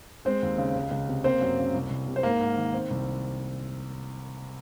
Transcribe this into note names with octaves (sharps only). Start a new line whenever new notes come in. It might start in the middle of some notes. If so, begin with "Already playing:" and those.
G#3 C4 C5
D#2
C#3
C#2
C#2
C3
A#3 C4 C5
F#2
C#3
C2
C2
C3
C5
G#2 A#3 A#4
G#2
D#3
C4
C2